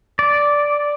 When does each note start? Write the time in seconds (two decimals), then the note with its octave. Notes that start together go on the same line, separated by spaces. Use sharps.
0.19 D5